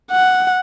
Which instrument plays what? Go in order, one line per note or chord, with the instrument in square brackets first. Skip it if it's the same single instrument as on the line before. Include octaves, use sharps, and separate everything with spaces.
[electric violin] F#5